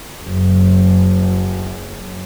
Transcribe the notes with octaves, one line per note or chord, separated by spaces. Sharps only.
F#1 F#2